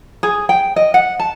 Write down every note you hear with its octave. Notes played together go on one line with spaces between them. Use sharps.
G#4
G5
D#5
F#5
A5